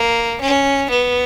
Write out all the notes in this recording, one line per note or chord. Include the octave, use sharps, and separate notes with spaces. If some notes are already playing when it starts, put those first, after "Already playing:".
Already playing: A#3
C#4
B3